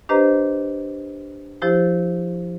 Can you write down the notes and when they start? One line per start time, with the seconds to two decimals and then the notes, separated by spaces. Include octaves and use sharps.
0.09 D4 G4 B4 C5 D#5 A#5
1.62 F3 E4 G4 C5